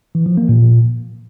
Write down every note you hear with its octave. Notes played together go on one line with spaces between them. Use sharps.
E3
F3
A#3
A#2